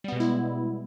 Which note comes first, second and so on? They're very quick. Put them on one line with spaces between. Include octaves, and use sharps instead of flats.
G3 B3 B2 G#3 E4